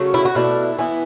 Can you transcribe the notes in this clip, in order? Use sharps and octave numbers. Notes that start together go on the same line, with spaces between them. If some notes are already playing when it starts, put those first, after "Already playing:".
Already playing: C#3 F#3 A3
E4
F#4
B2 A3 D4 E4
E3 B3 E4